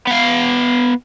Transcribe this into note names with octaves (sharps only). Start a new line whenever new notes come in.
B3 F5